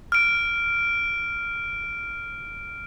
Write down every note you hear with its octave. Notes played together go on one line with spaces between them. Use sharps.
F6 D7